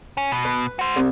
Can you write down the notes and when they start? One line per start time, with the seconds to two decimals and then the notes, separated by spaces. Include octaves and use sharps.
0.17 C#4
0.32 B2
0.45 B4
0.79 F#4 C5
0.97 C2